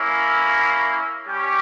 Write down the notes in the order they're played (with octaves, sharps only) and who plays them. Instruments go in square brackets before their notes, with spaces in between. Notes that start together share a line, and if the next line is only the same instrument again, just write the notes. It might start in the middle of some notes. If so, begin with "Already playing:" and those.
Already playing: [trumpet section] A#3 C#4 E4
G3 C#4 G4